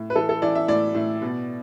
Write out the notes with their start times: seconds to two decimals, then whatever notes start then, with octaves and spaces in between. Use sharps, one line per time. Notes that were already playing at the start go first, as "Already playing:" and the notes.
Already playing: A2
0.10 B4
0.15 E3 A4
0.29 A4
0.42 E3 D5
0.55 E5
0.68 A2 D5
0.95 A2
1.22 B2